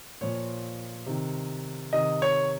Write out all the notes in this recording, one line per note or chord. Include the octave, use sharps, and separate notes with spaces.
A#2 F3 C#5
C3 D#3
C3 D#3 D#5
C#5